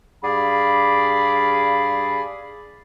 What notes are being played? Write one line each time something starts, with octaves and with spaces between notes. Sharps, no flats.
G2 G#4 D5 F5 B5